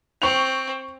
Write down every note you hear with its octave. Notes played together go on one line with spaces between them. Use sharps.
C4 C#6 F7